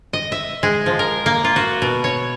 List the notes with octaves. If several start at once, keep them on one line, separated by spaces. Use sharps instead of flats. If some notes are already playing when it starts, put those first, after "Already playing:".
D#5
E5
G#3
F3
A#4
A#3
F4
F#4
B2
C#5